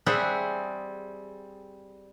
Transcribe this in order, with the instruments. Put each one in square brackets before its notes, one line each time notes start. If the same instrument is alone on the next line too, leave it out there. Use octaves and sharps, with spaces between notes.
[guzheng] G3 C4 G#4 C5 E5 F#5